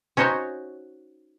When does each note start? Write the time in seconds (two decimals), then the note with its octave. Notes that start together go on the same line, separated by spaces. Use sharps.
0.17 C#4 D#4 F#4 C5 C#5